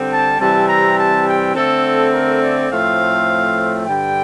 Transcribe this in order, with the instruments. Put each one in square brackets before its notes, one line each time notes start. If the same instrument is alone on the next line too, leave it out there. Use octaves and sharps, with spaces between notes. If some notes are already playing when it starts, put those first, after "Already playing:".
Already playing: [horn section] D3 G3 C4
A5
C3 E3 G3 C4 A5
A#5
A5
G5
D3 A3 C4 A4
A#4
D5
A2 F3 A3 C4 F5
G2 D3 G3 G5